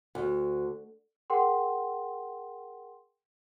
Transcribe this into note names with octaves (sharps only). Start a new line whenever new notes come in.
D2
G#4 A#4 F#5 G5 C6